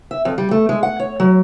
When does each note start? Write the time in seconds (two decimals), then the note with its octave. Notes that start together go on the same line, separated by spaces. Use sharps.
0.11 E5
0.25 F2
0.38 G3
0.51 A3
0.69 G#3
0.83 F#5
0.99 C#5
1.20 F#3